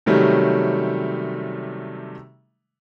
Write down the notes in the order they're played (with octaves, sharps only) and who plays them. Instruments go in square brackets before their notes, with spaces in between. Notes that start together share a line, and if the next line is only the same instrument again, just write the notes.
[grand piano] C3 D#3 F#3 G3 A3 C#4